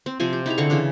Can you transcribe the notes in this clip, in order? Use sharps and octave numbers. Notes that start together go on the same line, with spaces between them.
C4
C3 F3 C4 G#5
G4
D#4 E4 G#4 A#5
D3 C4 F5 C#6
C#3 E3 D4